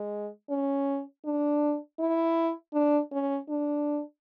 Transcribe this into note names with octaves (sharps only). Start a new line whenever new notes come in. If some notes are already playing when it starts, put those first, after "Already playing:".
Already playing: G#3
C#4
D4
E4
D4
C#4
D4